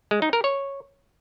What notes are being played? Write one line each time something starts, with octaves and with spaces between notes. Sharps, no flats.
G#3
D#4
A#4
C#5